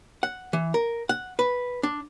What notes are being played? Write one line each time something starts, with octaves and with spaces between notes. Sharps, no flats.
F#5
E3
A#4
F#5
B4
D4